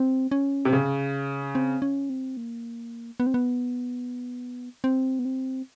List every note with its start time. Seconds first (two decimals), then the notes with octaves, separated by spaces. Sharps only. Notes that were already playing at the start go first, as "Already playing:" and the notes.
Already playing: C4
0.31 C#4
0.65 C3
0.73 C#3
1.55 C4
1.82 C#4
2.10 C4
2.37 A#3
3.20 B3
3.27 C4
3.34 B3
4.84 C4
5.19 B3
5.25 C4